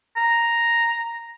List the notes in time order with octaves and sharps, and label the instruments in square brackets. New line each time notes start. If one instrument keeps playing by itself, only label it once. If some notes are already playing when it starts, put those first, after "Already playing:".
[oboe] A#5